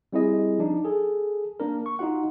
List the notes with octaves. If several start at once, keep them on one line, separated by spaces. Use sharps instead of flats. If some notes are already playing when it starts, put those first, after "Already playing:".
G3 C4 E4 G#4 D#5
F3 D4 D#4
G#4 A4
A#3 D4 A#4
C#6
D#4 F4 F#4 F#5